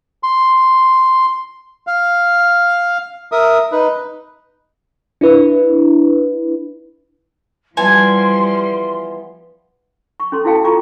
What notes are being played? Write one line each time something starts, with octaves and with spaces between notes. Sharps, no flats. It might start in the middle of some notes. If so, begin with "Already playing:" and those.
C6
F5
A#4 E5 D#6
D#4 B4
D4 E4 B4
E3 F3 G3 B3 F4 G#5 C6
C#6
C#4 A4 C6
E4 F#4 A4 F5 G5 A5
F4 A4 G5 A#5 C#6 D6